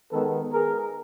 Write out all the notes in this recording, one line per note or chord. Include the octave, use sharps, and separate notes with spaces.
D#3 G#3 B3 A4 B4
G#4 A#4